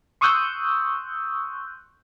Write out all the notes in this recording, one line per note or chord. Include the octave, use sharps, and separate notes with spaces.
C6 C#6 D#6 E6 F#6 G6